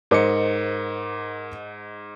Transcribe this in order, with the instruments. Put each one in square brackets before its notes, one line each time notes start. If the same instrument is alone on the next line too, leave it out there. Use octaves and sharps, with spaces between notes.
[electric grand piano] G#2 D#5 C#7 [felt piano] A#4 C5 D6